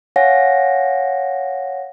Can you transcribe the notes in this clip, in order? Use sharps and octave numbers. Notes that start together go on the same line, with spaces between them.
C#5 F5 F#5 G#5 A#6